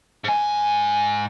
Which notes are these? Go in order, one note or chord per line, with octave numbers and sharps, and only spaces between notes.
G#2 G#5